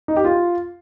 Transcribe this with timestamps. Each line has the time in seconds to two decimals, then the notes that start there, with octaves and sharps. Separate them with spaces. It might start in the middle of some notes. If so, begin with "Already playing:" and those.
0.08 D#4
0.16 G4
0.25 F4